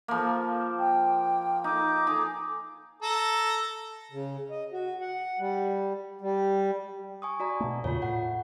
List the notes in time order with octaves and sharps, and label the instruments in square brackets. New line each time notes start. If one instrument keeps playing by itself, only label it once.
[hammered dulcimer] F3 A#3
[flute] G5
[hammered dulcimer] D#4 [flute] D6
[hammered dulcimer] D#4 G#4
[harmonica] A4 A#5
[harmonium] C#3
D#5
F#4
F#5
G3
G3
[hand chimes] G#5 C#6 D#6
F#4 D5 A#5
[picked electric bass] B2 A3
[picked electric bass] E2 A#2 C#3 [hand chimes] F4 C#5
[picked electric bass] A2 [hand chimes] F#5